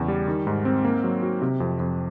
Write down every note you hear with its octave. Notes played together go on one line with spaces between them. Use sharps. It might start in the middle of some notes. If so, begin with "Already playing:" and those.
Already playing: E2 C#3
G3
D#3
G#2
C4
A#3
F#3
F#4
C3
F2
F2